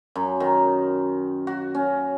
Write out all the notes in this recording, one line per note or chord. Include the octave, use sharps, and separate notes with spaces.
F#2
D#3
F#4
C#4